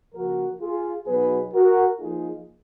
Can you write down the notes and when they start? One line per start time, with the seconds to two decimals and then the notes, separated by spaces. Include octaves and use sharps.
0.15 C#3 F3 A#3 F#4 A#4
0.61 F4 G#4
1.07 B2 F#3 B3 D#4 G#4 B4
1.54 F#4 A#4
1.99 F3 A#3 D#4 F4 G#4